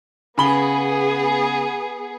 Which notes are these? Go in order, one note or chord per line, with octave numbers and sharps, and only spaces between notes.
C#3 B3 G#4 B5 G7